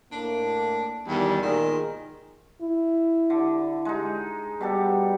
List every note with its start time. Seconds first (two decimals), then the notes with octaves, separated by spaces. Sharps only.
0.12 A2 A#3 D4
1.07 E2 D#3 G3
1.42 A#2 D#3 G#3
2.62 E4
3.30 D3
3.85 G#3 D#4
4.61 B2 G3 G4 A4